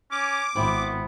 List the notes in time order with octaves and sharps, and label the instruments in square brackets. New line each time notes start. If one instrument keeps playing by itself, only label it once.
[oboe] C#4 [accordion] D6
[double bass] G#1 [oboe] B3 [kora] C4 E4